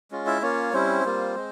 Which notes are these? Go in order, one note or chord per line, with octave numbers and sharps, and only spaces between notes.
G#3 C#4 F4
E4 E5
A#3 C#4 F4 C#5
G3 C4 C#4 E4 C5
G3 A#3 F4
G#3